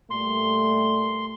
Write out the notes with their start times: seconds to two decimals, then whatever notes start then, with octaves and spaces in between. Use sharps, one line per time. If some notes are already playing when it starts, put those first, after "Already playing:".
0.11 A#2 G3 A3 C6